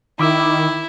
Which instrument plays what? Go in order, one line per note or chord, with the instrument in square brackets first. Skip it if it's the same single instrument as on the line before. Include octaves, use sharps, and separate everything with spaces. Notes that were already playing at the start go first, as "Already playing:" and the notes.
[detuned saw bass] D#3 [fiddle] E4 [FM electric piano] B5 D6 E6